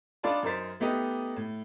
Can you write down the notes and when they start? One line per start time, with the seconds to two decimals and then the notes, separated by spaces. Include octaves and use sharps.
0.23 D4 D#4 F4 D5 A5 B5
0.43 F#2 D#4 A#4 C5 A6 B6
0.80 A3 B3 D#4 G4 D#5
1.36 A2